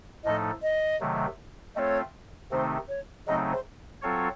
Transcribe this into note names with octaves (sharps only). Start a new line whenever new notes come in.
A2 F3 A3 D#4 A4 D#5
D#5
C3 D#3 F#3 A3
A3 C4 F4 A4 C#5 D#5
C3 D#3 A3 C4 D#4 C5
C#5
C#3 F#3 A3 C4 D#4 D#5
C5
F#3 C4 F4 A4 C#5